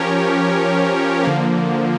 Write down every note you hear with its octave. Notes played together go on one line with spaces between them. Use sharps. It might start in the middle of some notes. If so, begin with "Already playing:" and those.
Already playing: F3 C#4 G4 A#4 C#5
D3 F3 A#3